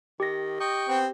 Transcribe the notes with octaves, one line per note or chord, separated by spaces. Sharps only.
D#3 G4 A#6
D#5 G5 C#6
B3 C4